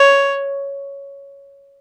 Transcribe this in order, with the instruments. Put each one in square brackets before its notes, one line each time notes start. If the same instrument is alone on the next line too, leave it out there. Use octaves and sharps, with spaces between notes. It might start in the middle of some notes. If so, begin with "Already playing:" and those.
Already playing: [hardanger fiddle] C#5